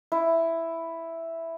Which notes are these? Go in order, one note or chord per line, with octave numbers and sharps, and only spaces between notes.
E4